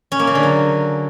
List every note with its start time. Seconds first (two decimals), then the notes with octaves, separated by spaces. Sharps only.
0.12 C#4
0.19 A#3
0.27 C#3
0.35 D3
0.43 F#3